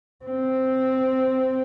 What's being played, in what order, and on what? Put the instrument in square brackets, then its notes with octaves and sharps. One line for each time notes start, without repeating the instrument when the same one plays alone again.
[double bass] C4